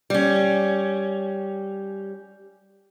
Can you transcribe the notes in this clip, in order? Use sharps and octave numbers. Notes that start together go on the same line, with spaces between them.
G3 C#4